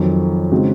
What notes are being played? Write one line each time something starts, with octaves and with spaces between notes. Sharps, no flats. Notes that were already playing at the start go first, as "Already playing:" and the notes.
Already playing: F2 D#3 F#3
C#3 G#3 C4 D#4 F#4